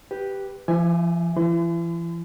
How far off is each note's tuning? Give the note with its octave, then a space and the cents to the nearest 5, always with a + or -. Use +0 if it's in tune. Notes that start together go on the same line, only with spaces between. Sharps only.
G4 +0 B4 +0
F3 -40 E5 +0 G#5 +0
E3 +40 C6 -45